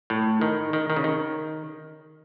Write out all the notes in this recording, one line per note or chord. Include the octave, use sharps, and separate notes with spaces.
A2
D#3
D#3
D#3
C#3
D#3